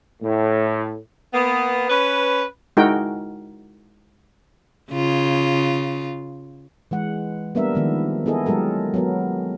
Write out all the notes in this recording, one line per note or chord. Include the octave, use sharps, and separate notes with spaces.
A2
A#3 B3
C#4 B4
G#3 D#4 E4 F#4 A#4 G5
C#3 F4
E3 G#3 F#5
G3 A#3 B3 D4 A#4 E5
D#3 F3 G#3 B3
B3 E4 G#4 A4 D#5
F#3 G#3 G4 A4 A#4
F#3 B3 A#4